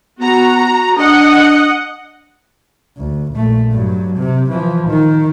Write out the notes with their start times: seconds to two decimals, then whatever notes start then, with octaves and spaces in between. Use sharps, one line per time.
0.20 B3 F#4 A#5
0.97 D4 D#5 F#5
2.97 D2
3.32 A#1 A3
3.71 G2 F#3
4.17 C3
4.51 E3 F3
4.88 D#3